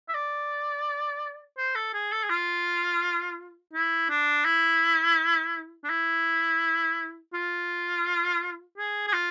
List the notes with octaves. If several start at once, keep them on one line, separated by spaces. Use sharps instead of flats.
E5
D5
C5
A4
G#4
A4
G#4
F4
E4
D4
E4
D4
E4
F4
G#4
G#4
F4